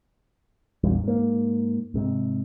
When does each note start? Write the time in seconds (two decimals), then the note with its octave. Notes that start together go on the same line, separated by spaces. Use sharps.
0.84 A#1 E2 G2
1.04 G#2 A#3
1.94 G#2 C3